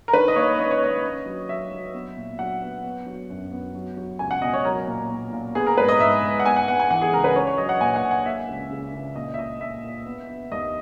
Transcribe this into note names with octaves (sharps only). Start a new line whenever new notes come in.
A#4
D#3 B4
D#5
A#3 C#5
C#4 D#5
C#5
A#3 D#5
C#4
F#3
F#3 E5
F#3
B3
A#2
F#3 F#5
B3
B3
F#3
F#2
B3
F#3
F#3
C#2 G#5
F#5
B2 D#5
C#5
F#3 A#4
A#2
A#2
A#2
B3 G#4
A#4
G#2 B4
D#5
G#2 E5
G#2
F#5
B3 G#5
F#5
B3 F#5
G#5
E3 F#5
G#4
C#2 A#4
B4
C#4 C#5
C#5
F#3 D#5
F#5
A#2 G#5
F#5
A#2
F#5
A#3 E5
C#2
C#3
C#2
A#2 D#5
E5
A#2 D#5
A#2 E5
A#2
B3
B3
D#2 D#5